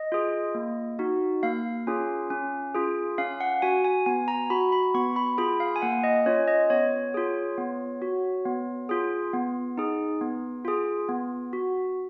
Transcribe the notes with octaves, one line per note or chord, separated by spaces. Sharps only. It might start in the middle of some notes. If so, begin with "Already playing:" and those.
Already playing: D#5
F4 G#4
A#3
D#4 F#4
A#3 F5
C#4 F4 G#4
C#4
F4 G#4
C#4 F5
F#5
F#4 G#5
G#5
B3 G#5
A#5
F#4 B5
B5
B3 C#6
B5
F4 G#4 B5
F5
G#5
A#3 F#5
D#5
C#4 F4 C#5
D#5
B3 C#5
F4 G#4
B3
F#4
B3
F4 G#4
B3
D#4 G#4
B3
F4 G#4
B3
F#4